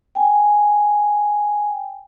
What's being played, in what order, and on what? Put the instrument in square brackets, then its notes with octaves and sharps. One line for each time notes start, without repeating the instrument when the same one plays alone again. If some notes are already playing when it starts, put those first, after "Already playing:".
[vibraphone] G5 G#5